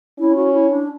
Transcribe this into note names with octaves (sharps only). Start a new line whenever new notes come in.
C#4 E4
F#4
E4
D4